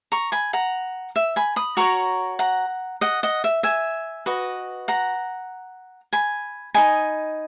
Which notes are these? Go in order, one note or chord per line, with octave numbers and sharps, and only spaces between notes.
A#5 C#6
G#5 B5
F#5 A#5
E5
G#5 B5
B5 D#6
F#4 A#4 C#5 A#5 C#6
F#5 A#5
D#5 F#5
D#5 F#5
E5
E5 G#5
F#4 B4 D#5
F#5 A#5
G#5 B5
D#4 G#4 D#5 G#5 B5